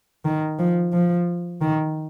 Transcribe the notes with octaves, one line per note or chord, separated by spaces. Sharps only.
D#3
F3
F3
D#3